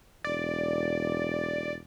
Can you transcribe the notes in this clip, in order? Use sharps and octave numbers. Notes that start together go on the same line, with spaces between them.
E1 D5